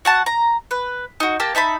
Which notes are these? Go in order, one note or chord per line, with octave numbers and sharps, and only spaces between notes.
F#4 F#5 A5
A#5
B4
D#4 F#4
A#3 G4 A5
D#4 E5 A5 B5